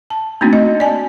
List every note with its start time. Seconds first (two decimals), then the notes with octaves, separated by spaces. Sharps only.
0.10 A5
0.41 A3 A#3 C4 D4 D#4 F#4
0.53 D#5
0.80 D5 G#5 A5